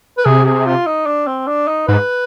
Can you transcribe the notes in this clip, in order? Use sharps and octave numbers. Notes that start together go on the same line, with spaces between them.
B4
C3 G#4
G#4
F4
D#4
D4
C4
D4
D#4
G#2 B4